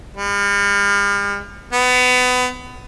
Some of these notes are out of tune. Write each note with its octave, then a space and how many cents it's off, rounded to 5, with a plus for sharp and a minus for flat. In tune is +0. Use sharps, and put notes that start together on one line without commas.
G3 +45
B3 +25